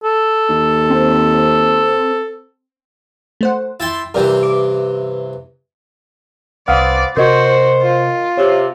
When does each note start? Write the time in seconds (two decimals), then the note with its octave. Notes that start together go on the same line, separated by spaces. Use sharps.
0.04 A4
0.49 D#2
0.90 C4
3.41 A3 C5 F#5
3.80 E4 G5 C6 A6
4.14 G2 C3 E3 A#4 D5 G5
4.43 D6
6.68 C2 C4 B4 D5 F5 F#5 D#6 F6
7.17 C3 F#4 A#4 C5 D#5
7.82 F4
8.37 C3 C#5